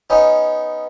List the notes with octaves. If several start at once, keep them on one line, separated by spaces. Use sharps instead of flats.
B3 C#4 D#4